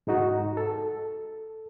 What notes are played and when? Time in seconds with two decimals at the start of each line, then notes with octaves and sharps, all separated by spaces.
0.07 G#2 G#3 D#4 F#4
0.57 A4